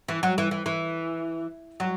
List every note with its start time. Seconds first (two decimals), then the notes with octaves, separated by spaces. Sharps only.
0.08 E3
0.23 F#3
0.38 E3
0.51 E3
0.66 E3
1.80 F#3